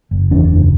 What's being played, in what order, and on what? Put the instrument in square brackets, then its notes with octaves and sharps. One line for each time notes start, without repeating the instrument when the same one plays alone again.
[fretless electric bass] F#1
E2 D4
F#1